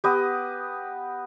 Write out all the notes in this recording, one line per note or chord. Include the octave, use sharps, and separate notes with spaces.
B3 G4 B4 D#5